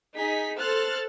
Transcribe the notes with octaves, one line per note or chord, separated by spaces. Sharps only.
D#4 G#4 B6
A4 C5 F6 F#6 A6